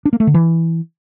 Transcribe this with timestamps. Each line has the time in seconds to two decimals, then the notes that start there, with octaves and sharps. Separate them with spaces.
0.05 D4
0.13 A#3
0.20 A3
0.27 D3
0.34 E3